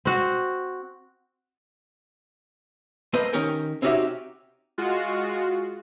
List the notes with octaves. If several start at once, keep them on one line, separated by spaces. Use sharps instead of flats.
C4 F#4
A3 A#3 C4 B4 C5 D#5
D#3 C#4 G4 A#4 G#5
C4 C#4 D#4 F#4 G4 E5
G#3 F4 F#4